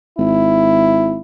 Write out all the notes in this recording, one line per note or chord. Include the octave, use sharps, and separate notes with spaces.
G#1 E4